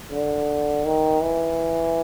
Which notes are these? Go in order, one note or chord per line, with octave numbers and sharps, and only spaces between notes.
D3
D#3
E3